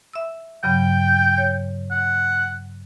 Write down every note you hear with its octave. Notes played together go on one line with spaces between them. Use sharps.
E5 E6
G2 C#3 F#3 G5
C#5
F#5